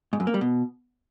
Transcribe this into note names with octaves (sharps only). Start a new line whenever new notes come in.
G#2
F#2
A#3
G3
B2